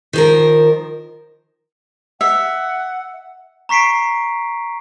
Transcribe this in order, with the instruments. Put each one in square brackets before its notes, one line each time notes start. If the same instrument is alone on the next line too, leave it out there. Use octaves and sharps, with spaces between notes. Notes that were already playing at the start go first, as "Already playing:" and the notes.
[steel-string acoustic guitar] D#3 F3 A#4
[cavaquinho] E5 [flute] F#5
[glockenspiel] A#5 C#6 B6 C7 D7